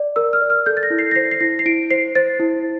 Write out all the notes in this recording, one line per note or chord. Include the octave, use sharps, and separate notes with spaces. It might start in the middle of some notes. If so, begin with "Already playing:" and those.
Already playing: D5
A#4 E6
F6
D5
F6
A4 G6
A6
A#6
E4
C7
A#6
C5 C7
C7
E4 A#6
C7
E4 D7
C5 C7
C5 A6
E4